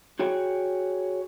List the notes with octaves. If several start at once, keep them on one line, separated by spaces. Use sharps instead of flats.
F#4 G#4 C#5 G5